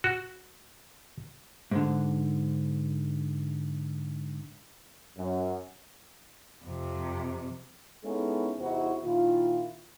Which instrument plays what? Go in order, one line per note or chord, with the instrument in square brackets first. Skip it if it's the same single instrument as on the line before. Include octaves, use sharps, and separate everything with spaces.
[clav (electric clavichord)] F#4
[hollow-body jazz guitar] G#2 D3
[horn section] F#2
[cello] F2 C3
[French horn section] G#3 B3 C#4 D#4 E4 A4
E2 C3 D#4 E4 F#4 C5
A#2 D#3 E4 F4